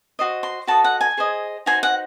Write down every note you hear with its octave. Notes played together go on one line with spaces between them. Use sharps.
F#4 C5 D#5
C6
F#4 A4 D#5 A5
F#5
G#5
G#4 C5 D#5
D#4 F#4 C5 G#5
F#5